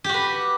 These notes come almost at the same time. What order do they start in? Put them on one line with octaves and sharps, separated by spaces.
G4 F#4 B4